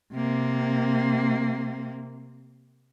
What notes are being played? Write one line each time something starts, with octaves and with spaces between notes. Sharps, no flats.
C3 A#3